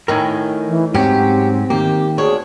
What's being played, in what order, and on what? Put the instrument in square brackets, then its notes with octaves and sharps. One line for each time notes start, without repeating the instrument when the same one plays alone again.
[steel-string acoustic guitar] A2 D#3 [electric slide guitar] A#4 G#5
[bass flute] E3
[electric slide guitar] G#2 F#3 C#4 [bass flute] C4 [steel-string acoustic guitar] G4
[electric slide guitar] D#3 A#3 [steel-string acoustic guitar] G4
[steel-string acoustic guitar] D2 D4 C#5 [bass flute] G#4